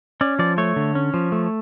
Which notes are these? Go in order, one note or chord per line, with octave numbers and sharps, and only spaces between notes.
C#4 D5
F3 D5
A3 C#5
D3
C#4
F3
A3